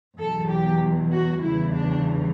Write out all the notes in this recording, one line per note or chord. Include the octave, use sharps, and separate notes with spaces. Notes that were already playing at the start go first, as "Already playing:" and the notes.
E2 B2 F#3 A4
G4
F#4
E2 C#3 E3 G3 E4
D4